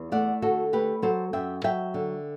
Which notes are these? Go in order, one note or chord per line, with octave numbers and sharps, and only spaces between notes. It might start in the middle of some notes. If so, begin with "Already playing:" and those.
Already playing: E2
A3 D5 F#5
D3 F#4 A4
A3 G4 B4
F#3 A4 C5
F#2 E5 G5
F#3 E5 G5
D3